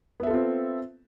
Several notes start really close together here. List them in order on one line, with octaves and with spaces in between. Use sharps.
B3 E5 A4 F4 C4